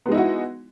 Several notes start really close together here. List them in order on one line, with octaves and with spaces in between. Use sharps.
B3 G#3 D#4 E4 F#4